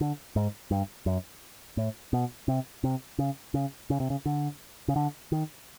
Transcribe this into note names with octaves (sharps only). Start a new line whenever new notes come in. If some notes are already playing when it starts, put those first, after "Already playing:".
D3
G#2
G2
F#2
A2
B2
C3
C3
C#3
C#3
C#3
C3
C#3
D3
C#3
D3
D#3